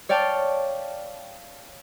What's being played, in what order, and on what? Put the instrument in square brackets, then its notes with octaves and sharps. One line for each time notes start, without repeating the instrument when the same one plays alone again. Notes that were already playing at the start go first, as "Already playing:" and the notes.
[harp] C#5 D5 F5 G5 A5